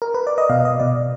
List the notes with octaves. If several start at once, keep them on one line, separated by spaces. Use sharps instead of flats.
A#4
B4
D5
D#5
B2 F5
D#5
B2 D5